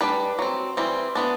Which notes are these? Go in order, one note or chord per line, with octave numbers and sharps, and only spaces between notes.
G3 D4 B4
F#3 C4
E3 G3 C4
E3 B3 D4